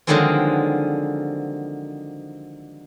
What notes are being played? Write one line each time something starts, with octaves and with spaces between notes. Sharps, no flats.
D3 D#3 F3 F#3 G#3 C4